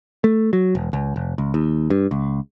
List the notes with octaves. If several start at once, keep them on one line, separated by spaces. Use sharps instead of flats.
A3
F#3
E1
C#2
F1
C#2
D#2
G2
C#2